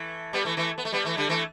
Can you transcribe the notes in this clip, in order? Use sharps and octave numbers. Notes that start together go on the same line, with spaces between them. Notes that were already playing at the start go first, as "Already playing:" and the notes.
Already playing: E3 A3
G3 B3
E3 A3
E3 A3
B3
A3
G3 B3
E3 A3
D3 G3
E3 A3